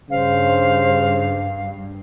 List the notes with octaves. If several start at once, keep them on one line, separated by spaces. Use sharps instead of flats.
G2 C#3 C5 F5